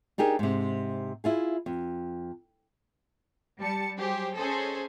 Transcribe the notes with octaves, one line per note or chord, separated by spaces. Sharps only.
D4 D#4 G4 G#4 A#4
G#2 C3
E4 F4 G#4
F2
G3 A5 C#7
F#3 G4 G#4 C5
C#4 G#4 A4 C5 D#5